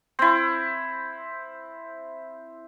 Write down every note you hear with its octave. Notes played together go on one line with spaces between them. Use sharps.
C4 E4